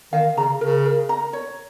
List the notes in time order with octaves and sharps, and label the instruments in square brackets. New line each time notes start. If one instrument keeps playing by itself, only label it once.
[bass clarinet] D#3 [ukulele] F5
[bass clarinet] C#3 [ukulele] A#5
[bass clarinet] C#3 [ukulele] A#4
[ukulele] A#4
A#5
C#5